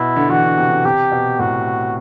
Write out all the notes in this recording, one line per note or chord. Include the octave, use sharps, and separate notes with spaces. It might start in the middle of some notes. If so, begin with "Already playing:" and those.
Already playing: B2 E4
D3
E3 F#4
D3
C3
D3
C3 G4
B2
A2 F#4